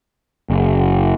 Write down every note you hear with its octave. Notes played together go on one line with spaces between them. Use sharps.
F#1